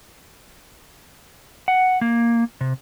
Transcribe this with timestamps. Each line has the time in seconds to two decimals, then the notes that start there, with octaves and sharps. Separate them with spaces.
1.68 F#5
2.01 A#3
2.61 C3